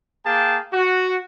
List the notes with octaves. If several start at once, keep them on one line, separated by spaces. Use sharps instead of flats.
A#3 G#4 F5 G5 A5
F#4